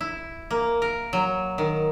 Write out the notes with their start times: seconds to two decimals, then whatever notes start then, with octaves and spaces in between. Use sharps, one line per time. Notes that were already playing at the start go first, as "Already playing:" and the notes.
0.01 E4
0.51 A#3
0.82 A#4
1.13 F#3
1.58 D#3